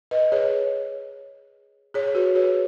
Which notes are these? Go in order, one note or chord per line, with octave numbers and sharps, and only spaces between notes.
B4 D#5
G#4 C#5
G#4 C#5
F#4 B4
G#4 C#5